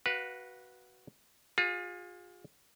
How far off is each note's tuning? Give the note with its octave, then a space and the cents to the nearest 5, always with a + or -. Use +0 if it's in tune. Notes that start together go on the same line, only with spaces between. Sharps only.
F#4 +10 B4 -15 F5 -5
F4 +30 G#4 -30